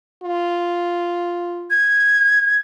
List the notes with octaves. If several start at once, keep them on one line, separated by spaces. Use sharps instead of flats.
F4
G#6